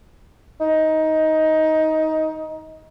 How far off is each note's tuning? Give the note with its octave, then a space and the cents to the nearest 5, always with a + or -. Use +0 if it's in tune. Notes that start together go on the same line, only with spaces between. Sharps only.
D#4 +15